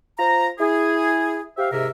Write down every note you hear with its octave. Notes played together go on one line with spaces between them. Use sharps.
F4 C5 A#5
E4 G#4
G4 C5 E5 F5
G#2 C3 A#4 E5